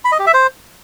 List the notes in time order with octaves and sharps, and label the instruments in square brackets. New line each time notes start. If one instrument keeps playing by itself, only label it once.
[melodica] B5
D#5
G4
E5
C5